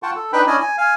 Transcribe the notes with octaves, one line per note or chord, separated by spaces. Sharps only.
F4 F#5 G5 A5 C#6
A4
D4 D#4 B4 G5 B5
C#4 D4 E4 D5 D#5 G#5
G#5
F5 G#5